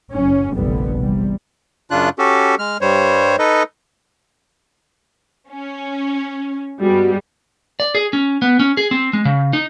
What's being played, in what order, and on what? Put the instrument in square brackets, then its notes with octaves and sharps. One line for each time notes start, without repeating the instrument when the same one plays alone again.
[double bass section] F#1 F#3 C#4
F1 A#1 F#2 D3 G3 B3
E2 C3 G3
[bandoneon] F#2 C#3 D4 F4 F#6
C#4 F#4 G4 A4
G#3 F6
G2 G3 C5 C#5
D#4 A4 B4 D#5
[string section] C#4
[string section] G2 G3 G#3 [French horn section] B3 F#4
[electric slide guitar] D5
G#4
C#4
B3
C#4
G#4
C4
G#3
C#3
D#4